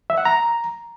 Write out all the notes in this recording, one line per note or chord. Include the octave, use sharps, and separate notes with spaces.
E5
F#5
A#5